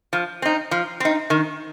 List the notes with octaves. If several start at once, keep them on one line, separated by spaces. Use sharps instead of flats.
F3
C4 D#4
F3
C4 D#4
D#3